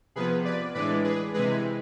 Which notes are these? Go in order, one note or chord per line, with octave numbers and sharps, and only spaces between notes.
C3 F3 B3 G#4 B4
B4 D5
A2 E3 G#3 D4 B4 D5
G#4 B4
C3 E3 G#3 G#4 B4